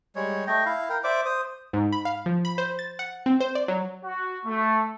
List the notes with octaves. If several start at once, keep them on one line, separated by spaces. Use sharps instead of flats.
G3 G#3 C#5
A3 D#5 G5
E4 F5
A#4 G5
C5 D5 E5 D6
C5 D#6
G#2
B5
F5
F3
B5
C5
A6
F#5
C4
C5
D5
F#3
F#4
A3